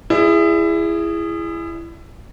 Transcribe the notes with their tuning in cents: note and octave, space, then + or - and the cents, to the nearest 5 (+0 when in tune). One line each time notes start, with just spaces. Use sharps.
E4 +20 G#4 -10 D5 +40